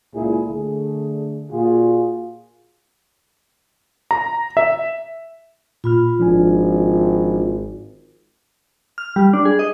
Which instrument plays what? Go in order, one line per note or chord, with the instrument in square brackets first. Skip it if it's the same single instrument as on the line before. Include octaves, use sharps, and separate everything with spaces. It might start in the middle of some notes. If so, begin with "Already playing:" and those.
[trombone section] C#2 A#2 E4 G#4
D3 A3 G#4
A#2 F4 F#4 G#4
[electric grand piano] A#5
E5
[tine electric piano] A#2 B5 F6 [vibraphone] F4
[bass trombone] G#1 [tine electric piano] F3 D4 G#5
[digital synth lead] F6
G3
D4
G#4
D#5